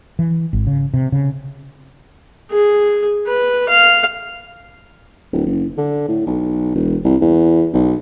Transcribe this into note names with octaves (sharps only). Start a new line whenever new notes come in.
E3
G#1
C#3
C3
C#3
G#4
B4
F5
D1
F#1
D3
A2
B1
E1
C2
E2
B1